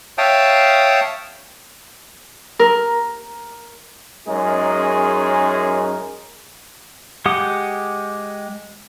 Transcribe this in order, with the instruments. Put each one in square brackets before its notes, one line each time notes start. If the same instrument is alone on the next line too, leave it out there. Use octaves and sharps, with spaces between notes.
[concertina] C#5 E5 F5 G5 A5 D#6
[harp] A#4
[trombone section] F#2 G#3 C#4 D#4 G#4 A#4
[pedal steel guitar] G#3 G4 F#5 D#6